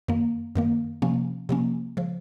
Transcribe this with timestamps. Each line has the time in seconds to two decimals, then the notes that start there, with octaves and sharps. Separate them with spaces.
0.08 F#2 D#3 A#3
0.56 F#2 D#3 A#3
1.02 C3 F3 A#3 C#4
1.49 C3 F3 A#3 C#4
1.97 C#3 F3